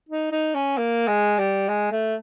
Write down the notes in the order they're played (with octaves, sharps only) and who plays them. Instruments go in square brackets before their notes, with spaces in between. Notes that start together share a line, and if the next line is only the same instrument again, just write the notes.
[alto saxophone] D#4
D#4
C#4
A#3
G#3
G3
G#3
A3